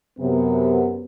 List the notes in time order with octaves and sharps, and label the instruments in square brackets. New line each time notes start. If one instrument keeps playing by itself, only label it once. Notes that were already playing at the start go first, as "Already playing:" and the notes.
[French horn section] F#2 C3 B3